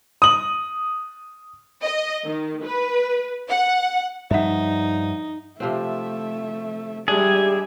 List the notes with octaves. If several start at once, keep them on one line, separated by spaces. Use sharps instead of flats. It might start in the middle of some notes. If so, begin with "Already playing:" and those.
D#6 F#7
D#5
D#3
B4
F#5
G2 F3 D#4 E5 F#5
C3 F3 A3 C4 E5
G3 G#3 D4 G4 G#4 E5